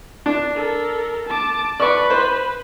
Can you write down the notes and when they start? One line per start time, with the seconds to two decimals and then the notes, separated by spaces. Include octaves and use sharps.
0.26 D4
0.55 A4 A#4
1.27 A5 D6
1.80 B4 D5 C#6
2.10 C5